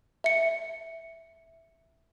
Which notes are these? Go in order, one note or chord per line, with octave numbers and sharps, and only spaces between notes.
E5 C#7